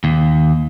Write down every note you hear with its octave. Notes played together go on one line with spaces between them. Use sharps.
D#2